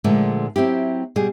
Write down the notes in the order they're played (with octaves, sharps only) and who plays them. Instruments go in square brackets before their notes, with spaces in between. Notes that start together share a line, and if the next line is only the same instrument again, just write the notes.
[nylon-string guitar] A#2 D3 F3 G#3 A3
F#3 C4 E4 G4
B2 G3 G#4